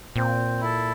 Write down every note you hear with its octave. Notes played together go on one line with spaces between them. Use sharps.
A#2 C4
E4 A4